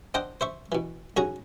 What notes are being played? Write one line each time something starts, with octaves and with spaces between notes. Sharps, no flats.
C4 D4 C5 D#5 F#5 G5
C5 E5 C#6
B2 E3
B1 C#4 F#4 G#4 F#5 A#5